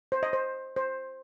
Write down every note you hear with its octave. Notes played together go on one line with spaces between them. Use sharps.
C5
D#5
C5
C5